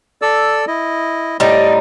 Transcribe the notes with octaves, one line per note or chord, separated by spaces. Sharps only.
A4 D5 E6
E4 D#5
A2 G3 D#4 D5 D#5